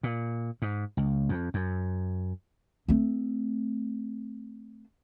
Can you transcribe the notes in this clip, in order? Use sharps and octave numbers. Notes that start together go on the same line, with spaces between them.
A#2
G#2
C#2
F2
F#2
A3 C4